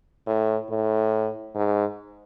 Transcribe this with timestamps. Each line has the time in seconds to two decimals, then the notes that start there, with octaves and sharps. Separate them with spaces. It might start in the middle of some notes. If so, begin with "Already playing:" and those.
0.27 A2
0.70 A2
1.55 G#2